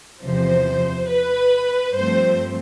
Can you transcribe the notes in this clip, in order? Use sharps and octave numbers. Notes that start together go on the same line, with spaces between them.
E2 C3 F3 C5
B4
G2 F3 A3 C4 C5